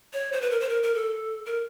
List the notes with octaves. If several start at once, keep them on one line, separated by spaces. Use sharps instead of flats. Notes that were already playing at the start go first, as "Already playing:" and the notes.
C#5
C5
B4
A#4
C5
A#4
A#4
A4
A#4